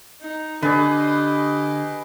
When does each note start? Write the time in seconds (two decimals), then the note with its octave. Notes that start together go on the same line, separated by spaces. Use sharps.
0.21 D#4
0.62 D3 G4 G#4 B4 D#5